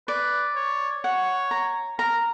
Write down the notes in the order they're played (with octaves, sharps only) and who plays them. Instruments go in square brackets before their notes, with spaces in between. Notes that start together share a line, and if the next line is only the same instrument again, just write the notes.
[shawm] B4 [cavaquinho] D5
[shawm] C#5
[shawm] C#5 [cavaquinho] F#5
[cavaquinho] A#5
[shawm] A#4 [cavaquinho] A#5